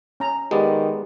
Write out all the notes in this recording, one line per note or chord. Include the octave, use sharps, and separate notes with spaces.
C#4 A#5
D#3 G#3 B3 G4 D5